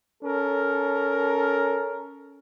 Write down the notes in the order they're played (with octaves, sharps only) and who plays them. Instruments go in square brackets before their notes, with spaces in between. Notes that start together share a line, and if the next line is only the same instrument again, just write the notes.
[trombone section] C#4 A4 A#4